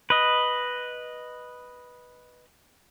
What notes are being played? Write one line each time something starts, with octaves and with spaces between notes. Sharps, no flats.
B4 D#5